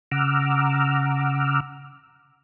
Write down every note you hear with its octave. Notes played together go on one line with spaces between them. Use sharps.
C#3 F#5 A#5 D6 E6 F6